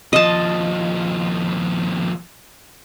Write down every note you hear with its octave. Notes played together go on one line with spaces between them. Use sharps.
D#2 F3 D#5 A5